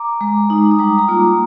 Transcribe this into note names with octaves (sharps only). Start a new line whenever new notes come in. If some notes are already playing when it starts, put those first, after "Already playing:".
Already playing: A#5 D6
G#3
D#4
D#6
G3 A#5 D6
A#5 D6
A#3 F4